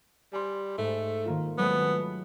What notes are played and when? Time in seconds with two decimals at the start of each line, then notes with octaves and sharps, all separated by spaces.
0.33 G3 G#5 C6
0.78 G#2 A3
1.25 D#3 A#3 F4
1.58 F#3 G#3 A3 B3